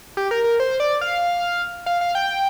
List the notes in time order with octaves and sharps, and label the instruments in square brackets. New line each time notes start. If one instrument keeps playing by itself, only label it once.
[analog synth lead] G4
A#4
A#4
C5
D5
F5
F5
F5
G5